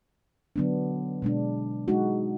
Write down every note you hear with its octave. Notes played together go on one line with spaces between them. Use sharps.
D3 F#3 B3 D4
B2 G#3 D4
G#3 D#4 F#4